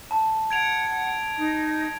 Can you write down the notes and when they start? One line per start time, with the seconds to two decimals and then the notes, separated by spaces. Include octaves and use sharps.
0.11 A5
0.51 F#5 G#6 D7 F7
1.36 D#4 D#5